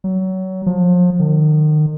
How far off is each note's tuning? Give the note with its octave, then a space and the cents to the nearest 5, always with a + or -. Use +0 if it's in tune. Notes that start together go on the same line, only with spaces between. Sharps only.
F#3 +25
F3 +35
D#3 -35